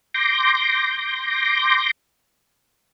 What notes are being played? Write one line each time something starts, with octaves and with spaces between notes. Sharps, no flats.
C6 D6 G6 A#6